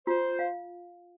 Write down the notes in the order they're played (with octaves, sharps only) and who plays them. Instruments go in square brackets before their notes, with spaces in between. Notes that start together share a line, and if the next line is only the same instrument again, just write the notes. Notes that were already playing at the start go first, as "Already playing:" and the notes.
[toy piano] F4 [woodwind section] C5
[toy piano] F5